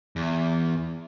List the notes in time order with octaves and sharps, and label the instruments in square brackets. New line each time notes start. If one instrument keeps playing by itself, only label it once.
[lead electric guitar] E2